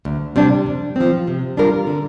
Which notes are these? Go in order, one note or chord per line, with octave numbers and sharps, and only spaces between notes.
D2
C3 G3 D4
F2
F3 C4
C3
G3 D4 F4 A#4
D3